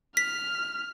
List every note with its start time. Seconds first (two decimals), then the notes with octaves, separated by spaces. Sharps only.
0.17 F6 B6